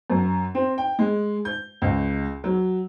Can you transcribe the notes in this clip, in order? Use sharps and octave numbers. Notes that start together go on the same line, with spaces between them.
F#2
C4
G5
G#3
G6
C#2
F#3